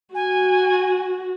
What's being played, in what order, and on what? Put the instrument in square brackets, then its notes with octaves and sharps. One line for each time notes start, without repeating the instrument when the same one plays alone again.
[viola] F#4 [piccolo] G#5